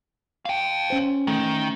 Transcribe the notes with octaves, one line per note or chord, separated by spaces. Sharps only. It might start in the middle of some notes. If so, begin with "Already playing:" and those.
F5 G5
C#4 C5
D#3 A3